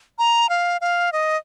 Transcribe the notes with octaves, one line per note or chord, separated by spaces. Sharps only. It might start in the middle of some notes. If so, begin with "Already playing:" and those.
A#5
F5
F5
D#5